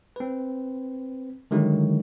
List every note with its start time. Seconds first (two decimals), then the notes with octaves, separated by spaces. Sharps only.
0.16 C4 B4
1.51 D3 D#3 F#3 G#3 E4